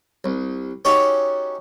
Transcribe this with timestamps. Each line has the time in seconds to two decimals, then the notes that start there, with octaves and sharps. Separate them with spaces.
0.24 C2
0.85 C#4 D#4 F#4 G4 A4 C#5